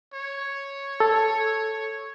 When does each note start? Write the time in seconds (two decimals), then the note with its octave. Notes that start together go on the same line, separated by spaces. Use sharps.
0.13 C#5
1.00 A4